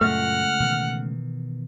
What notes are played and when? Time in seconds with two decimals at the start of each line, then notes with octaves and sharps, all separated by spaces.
0.01 C#2 F#2 A#2 A3 F#5 F6
0.60 B2 D#3 E3